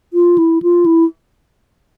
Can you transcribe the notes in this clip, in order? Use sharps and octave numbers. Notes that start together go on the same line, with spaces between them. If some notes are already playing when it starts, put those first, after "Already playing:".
F4
E4
F4
E4